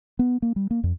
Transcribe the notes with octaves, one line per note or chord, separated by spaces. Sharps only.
B3
A#3
G3
A#3
F2